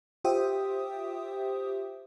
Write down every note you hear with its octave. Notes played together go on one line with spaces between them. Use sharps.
F4 G4 C5 E5 G5 D#6